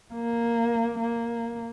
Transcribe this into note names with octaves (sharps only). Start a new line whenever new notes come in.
A#3
A#3